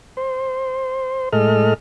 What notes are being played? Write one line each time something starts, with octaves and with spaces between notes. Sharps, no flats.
C5
A2 G#3 A4 D#5 F6